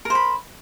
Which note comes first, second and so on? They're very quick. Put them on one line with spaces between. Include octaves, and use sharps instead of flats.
A#4 C5 B5